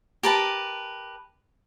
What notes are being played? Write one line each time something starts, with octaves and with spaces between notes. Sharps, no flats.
G4 A#4 B4 A5